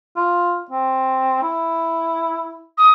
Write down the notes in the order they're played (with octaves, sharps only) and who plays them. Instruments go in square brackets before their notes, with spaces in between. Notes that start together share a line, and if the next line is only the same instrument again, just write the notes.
[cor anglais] F4
C4
E4
[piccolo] D#6